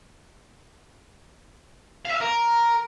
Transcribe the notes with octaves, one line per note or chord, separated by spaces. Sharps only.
F5
E5
F5
A#4